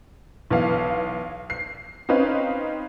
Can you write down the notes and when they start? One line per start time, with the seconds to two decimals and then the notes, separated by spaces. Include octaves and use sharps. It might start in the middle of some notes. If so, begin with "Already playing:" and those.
0.50 B1 E3 B3 F5
1.50 C7
2.09 C4 C#4 D#4 B4 F5